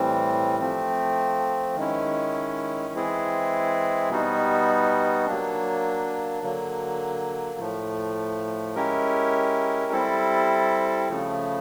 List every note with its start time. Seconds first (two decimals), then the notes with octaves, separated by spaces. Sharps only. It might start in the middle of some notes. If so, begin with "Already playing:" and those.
Already playing: A2 E3 G3 C4
0.59 F3 A3 C4
1.76 D#3 G#3 C#4 E4
2.94 E3 G#3 C4 E4 G#4
4.10 B2 G3 B3 D#4 F#4
5.26 F#3 A#3 D4
6.43 D3 F#3 A#3
7.59 A2 F3 A3
8.75 G#3 C#4 E4 G4 A#4
9.92 G3 C4 E4 A4
11.09 C#3 F3 A3